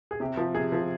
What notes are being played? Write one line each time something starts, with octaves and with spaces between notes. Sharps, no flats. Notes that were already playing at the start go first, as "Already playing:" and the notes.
G#4
C3 G4
F3
C3 G#4
F3